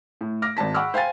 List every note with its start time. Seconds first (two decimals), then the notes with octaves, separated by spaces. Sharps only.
0.21 A2
0.42 D6 F6 A#6
0.57 G#1 D5 A5 B6
0.74 F#5 B5 C#6 D6 E6 F6
0.94 C5 F5 G5 G#5 A6